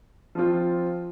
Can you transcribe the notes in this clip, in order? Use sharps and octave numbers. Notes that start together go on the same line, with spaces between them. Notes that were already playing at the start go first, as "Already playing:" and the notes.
F3 C4 F4